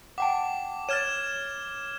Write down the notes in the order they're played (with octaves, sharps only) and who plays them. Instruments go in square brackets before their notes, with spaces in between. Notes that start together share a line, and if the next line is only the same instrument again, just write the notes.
[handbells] F#5 G5 A5 [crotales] D6
[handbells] C#5 A6 [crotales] F6 G#6 E7